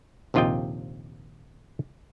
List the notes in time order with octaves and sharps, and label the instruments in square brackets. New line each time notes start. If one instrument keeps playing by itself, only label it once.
[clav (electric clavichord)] A#1 D#2 C3 F4 D#5 G5